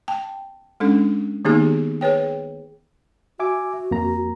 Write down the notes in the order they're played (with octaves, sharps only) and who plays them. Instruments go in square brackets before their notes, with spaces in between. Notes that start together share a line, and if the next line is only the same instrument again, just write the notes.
[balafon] G5 A5
G#3 C#4 D4 A4
D#3 A#3 B3 D#4 G4 G#4
G#4 B4 C#5 G5
[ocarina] F#4 [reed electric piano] E5 G#5 D6
[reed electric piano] F2 A#3 A#5